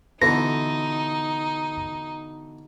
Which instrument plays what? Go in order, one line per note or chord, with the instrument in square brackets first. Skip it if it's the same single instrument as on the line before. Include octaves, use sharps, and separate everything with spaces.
[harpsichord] B2 D3 E3 [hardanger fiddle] D#4 [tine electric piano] A#6